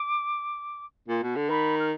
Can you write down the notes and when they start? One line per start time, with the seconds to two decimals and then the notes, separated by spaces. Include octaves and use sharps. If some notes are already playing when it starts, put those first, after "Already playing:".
Already playing: D6
1.08 A#2
1.23 B2
1.36 D3
1.49 D#3 B5
1.80 F6